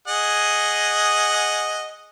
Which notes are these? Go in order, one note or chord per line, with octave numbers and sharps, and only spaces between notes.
G#4 D#5 F#5